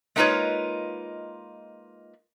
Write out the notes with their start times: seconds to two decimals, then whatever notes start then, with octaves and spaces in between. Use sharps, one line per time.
0.16 G#3 A#3 D#4 F4 B4 C#5